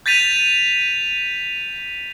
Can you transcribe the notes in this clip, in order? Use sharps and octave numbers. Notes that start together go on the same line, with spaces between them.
G6 A6 B6 D#7 F7